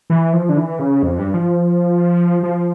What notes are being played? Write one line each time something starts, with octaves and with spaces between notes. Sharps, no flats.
E3
F3
D3
E3
C#3
F2
G2
F3
F3